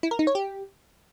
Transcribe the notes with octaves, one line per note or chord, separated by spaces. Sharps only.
E4
A#4
D#4
C#5
G4